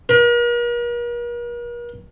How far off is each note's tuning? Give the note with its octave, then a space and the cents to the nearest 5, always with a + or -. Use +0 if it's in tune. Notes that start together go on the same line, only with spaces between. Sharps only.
A#4 +45